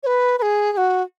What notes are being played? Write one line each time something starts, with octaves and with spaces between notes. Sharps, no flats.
C#5
B4
B4
G#4
G#4
F#4